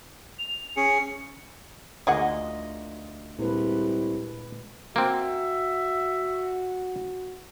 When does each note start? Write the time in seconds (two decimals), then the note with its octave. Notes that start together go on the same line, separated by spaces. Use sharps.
0.39 F7
0.77 C#4 G#4 C#7
2.07 D2 A#3 F4 G#4 A#4 D#5 F#5
3.39 C2 A#2 G#3 B4
4.96 A#3 C4 F#4 E5